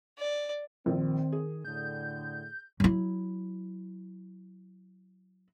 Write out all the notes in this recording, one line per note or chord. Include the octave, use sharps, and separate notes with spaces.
D5
A#1 D#3 C4
G#4
A2 D3 G6
F#3 E4